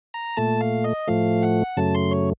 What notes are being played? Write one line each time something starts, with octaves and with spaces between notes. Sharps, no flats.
A#5
A#2 A3 A5
F5
D#5
A2 F3 A3 F5
F#5
F#2 C#3 F#3 A3 A5
C6
C#5